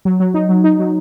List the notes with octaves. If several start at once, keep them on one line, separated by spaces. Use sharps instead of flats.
F#3
F#3
D#4
F#3
D#4
F#3